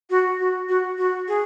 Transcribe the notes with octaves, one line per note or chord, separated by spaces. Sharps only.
F#4
F#4
F#4
F#4
G#4